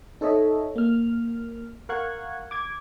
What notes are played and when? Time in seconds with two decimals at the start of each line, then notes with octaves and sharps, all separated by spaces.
0.21 D#4 A4 C#5 D#5 E5
0.76 A#3 F6
1.89 A#4 F5 F#5 C#6 F#6 G#6
2.51 D6 G#6